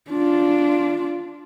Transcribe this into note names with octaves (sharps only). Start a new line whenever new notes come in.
D4 F4